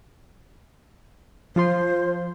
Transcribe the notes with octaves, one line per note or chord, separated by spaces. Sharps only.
F3 F4 C5 C6